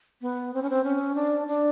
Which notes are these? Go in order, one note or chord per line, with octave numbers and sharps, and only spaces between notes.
B3
C4
C#4
C4
C#4
D4
D4